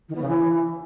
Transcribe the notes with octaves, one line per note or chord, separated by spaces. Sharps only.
D#3
B3
C#3
E3